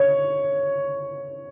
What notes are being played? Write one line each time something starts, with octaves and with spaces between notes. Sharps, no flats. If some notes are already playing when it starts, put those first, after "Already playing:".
Already playing: C#5